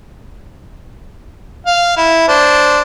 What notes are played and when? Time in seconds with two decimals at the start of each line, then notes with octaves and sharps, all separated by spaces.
1.67 F5
1.97 E4
2.28 D4 C5